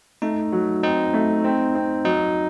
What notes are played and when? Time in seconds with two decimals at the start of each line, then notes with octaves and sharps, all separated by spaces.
0.22 A3 D#4
0.52 F#3
0.83 C4 D#4
1.14 A3
1.44 C4
1.75 C4
2.05 F#3 D#4